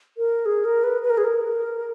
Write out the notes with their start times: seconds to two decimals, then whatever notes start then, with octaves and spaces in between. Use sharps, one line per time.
0.18 A#4
0.46 G#4
0.65 A#4
0.84 B4
1.02 B4
1.10 A#4
1.18 G#4
1.25 A#4